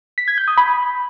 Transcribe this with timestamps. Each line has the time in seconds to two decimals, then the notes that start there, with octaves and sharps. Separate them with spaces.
0.18 B6
0.28 G#6
0.38 G6
0.48 D#6
0.57 B5